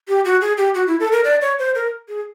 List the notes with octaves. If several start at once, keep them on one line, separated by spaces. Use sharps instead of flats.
G4
F#4
G#4
G4
F#4
E4
A4
A#4
D5
C#5
C5
A#4
G#4